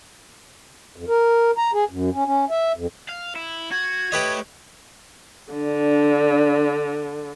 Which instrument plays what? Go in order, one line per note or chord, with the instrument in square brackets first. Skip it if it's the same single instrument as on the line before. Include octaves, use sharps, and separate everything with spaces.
[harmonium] F2
A#4
A#5
G#4
F#2
C#4
C#4
E5
F2
[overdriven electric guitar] F5
E4
[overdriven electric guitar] F#4 [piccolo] G#6
[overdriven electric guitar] A3 C#5 [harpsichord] G4 B4 D#5
[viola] D3 [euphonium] D4